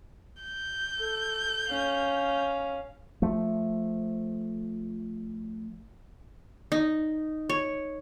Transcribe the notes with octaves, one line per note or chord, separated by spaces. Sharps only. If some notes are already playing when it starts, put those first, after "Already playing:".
G6
A4
C#4 F5
F3 A3
D#4
C#5